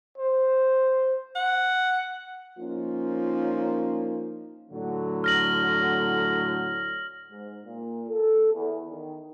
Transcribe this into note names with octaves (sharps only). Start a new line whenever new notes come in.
C5
F#5
F3 A#3 C#4 D#4 F4
A2 D3 F#3
F6 A#6 F#7
G#2
A#2
A4
E2
D#3